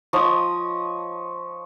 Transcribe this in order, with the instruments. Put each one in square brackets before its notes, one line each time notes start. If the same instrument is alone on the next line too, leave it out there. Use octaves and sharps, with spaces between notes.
[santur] F3 C#5 D#5 D#6